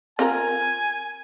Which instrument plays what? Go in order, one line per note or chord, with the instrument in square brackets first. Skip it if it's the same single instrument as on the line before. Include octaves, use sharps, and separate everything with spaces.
[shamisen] C4 F4 A#4 [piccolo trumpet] G#5